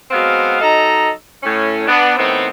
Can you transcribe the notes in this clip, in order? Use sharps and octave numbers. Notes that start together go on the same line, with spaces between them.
F#3 G#3 B3 C4 F5
F#3 D#4 A4 D#5 A#5
A2 C#4
B3 D4
A2 D#3 B3 C4